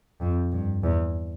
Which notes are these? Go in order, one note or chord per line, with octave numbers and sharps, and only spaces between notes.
F2
G2
E2